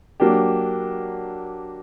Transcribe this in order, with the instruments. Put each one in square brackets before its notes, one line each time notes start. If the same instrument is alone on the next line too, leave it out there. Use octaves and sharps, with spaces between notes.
[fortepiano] F#3 A#3 D4 G4